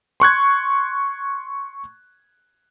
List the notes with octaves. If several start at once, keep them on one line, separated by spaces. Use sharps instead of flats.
C6 C#6 F#6 G#6